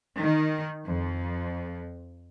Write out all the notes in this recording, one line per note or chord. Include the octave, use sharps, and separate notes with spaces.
D#3
F2